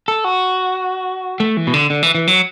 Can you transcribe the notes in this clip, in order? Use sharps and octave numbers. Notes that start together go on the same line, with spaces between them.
A4
F#4
A3
E3
B2
D3
D3
E3
E3
F#3